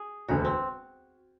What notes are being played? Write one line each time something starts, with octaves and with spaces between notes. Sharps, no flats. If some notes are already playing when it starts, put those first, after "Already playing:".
Already playing: G#4
E1 D2 D3 F#4
C4